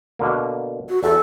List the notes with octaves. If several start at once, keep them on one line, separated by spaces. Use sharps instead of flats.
B2 D3 A#3
F#4
E2 A4